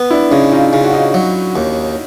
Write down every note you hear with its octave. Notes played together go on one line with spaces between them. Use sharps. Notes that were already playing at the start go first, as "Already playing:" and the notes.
Already playing: B3
D4 E4
C#3 C#4 D#4
D#4 F4
C#3 F4
F#4
D#4 F4
F#3
D#2